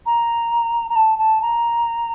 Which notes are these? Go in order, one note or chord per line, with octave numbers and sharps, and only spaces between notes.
A#5
A#5
A5
A5
A#5